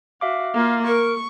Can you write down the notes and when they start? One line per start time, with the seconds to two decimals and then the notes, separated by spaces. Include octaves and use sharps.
0.21 F#4 E5 F5 D6
0.54 A#3 F4
0.87 A#4 C#6